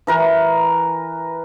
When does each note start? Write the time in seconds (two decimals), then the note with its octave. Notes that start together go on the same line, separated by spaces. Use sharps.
0.07 E3 A#4 B4